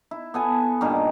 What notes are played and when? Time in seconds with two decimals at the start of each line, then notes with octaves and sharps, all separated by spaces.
0.11 E4
0.34 B3 A4 G#5
0.81 G2 A#2 D#3